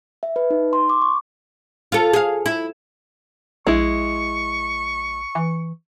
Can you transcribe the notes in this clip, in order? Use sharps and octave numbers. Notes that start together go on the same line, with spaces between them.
E5
B4
D#4
C6
D6
C#6
F4 A4
G#4 F5
E4
A#1 G#3 E4 C#6
E3